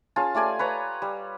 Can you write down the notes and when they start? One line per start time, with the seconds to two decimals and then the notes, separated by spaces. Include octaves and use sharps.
0.16 C#4 F4 G#4 A5
0.35 A3 G4 D5 G#5
0.59 B4 C#5 A#5
1.02 G3